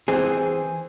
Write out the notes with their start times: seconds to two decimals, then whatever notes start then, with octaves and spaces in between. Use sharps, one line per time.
0.08 E3 C4 G#4